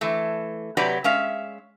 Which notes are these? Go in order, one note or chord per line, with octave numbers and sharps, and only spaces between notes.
E3 A3
C3 F#3 G4 B4 D5
G#3 C#4 E5 F5